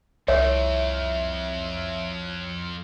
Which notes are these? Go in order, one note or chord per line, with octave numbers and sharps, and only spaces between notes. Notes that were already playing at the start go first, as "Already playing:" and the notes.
C2 F2 C#5 E5